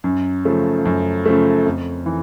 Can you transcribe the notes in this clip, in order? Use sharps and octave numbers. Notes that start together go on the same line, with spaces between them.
F#2
C#3 F3 A3
F#2
C#3 F3 A3
F2
E3